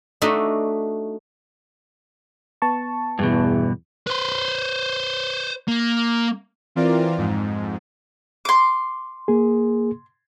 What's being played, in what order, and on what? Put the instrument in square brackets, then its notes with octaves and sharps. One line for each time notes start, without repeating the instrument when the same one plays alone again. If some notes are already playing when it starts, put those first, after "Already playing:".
[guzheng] A3 D4 D#4 F#4 D#5 E5
[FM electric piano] B3 A5 C#6
[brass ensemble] E2 E3 [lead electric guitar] G2 B2
[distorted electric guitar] B4 C5
A#3
[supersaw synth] E3 C4 F4 A#4 D5
F2 G#2
[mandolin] C6 D6
[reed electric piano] A#3 G#4